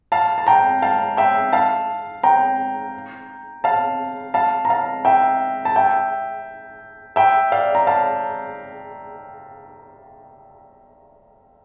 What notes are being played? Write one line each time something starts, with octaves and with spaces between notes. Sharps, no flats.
F5 A5
A5
G5 A#5
F5 A5
E5 G5
F5 A5
G5 A#5
F5 A5
F5 A5
A#5
F5 A5
E5 G5
A5
E5 G5
E5 G5
D5 F5
A#5
F5 A5